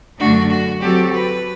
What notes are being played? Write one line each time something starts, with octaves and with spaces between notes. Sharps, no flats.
F#2 D3 A3 D4 F#4
F#4
F#3 C4 F#4 G4 A4
B4